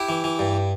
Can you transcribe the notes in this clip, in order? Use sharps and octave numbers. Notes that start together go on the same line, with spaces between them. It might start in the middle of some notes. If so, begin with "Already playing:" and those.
Already playing: E4 G4
E3
E3
G2